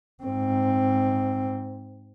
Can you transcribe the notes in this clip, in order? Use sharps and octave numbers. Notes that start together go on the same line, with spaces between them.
G#2 C4